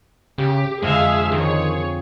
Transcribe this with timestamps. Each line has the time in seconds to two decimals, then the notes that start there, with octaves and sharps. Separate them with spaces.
0.38 C#3 G4
0.82 F2 D3 G#3 G#4 E5 F5
1.32 D#3 C4 G#4 C#5